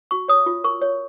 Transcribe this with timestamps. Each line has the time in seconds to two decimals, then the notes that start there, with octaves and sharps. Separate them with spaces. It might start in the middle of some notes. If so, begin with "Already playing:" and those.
0.11 F#4 C#6
0.28 C#5 D#6
0.46 F4
0.64 A#4 C#6
0.82 C#5